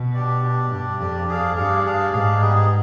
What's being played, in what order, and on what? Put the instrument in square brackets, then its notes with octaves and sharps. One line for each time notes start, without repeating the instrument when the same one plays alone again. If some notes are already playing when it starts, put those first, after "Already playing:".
Already playing: [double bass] B2
[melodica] D4 G4 D5
D4 G4 D5
[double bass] G2 [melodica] D4 G4 D5
[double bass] F2 [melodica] D4 G4 D5
[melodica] D4 G#4 D5 F5
[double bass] G2 [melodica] D4 G#4 D5 F5
[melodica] D4 G#4 D5 F5
[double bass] G#2 [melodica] D4 G#4 D5 F5
[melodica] G3 B3 D#4 G#4